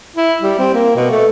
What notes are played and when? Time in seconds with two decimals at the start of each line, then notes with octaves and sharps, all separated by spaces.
0.16 E4
0.41 G3
0.59 C4
0.74 A#3
0.96 B2
1.11 A3